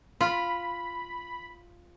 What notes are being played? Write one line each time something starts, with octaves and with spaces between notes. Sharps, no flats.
F4 B5